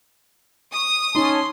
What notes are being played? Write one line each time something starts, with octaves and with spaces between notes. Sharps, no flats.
C#6 D#6
C#4 D#4 C#5 A5 C6